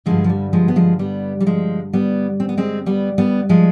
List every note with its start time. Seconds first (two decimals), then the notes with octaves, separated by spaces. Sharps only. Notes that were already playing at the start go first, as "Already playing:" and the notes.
0.06 G2 D3 F3 G#3
0.24 F3
0.29 G3
0.53 F3 G#3
0.68 B3
0.76 F3 G#3
0.99 G3 B3
1.41 G3
1.46 F3 G#3
1.93 G3 B3
2.40 C4
2.49 B3
2.57 G#3 C4
2.86 G3 B3
3.18 G3 B3
3.49 F3 G#3